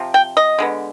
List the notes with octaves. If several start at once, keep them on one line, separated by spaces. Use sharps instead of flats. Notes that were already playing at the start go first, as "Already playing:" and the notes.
Already playing: C3 F3
G5
D#5
D3 G#3 B3